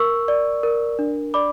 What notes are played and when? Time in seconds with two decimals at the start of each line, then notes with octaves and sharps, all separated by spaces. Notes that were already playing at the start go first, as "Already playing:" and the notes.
Already playing: A#4 C#6 E6
0.28 D5
0.63 A#4
0.99 D4
1.34 D5 B5 D6